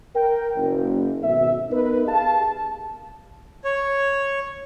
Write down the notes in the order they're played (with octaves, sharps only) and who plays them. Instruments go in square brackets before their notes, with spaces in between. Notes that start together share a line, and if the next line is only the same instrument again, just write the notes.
[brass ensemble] A#4 G5
F#1
G#1 B2 A4 E5
B3 D#4 A#4 B4
G4 G#4 F5 A5
[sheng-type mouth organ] C#5